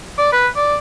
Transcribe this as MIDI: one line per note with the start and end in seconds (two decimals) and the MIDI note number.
0.18 0.28 74
0.33 0.47 71
0.56 0.76 74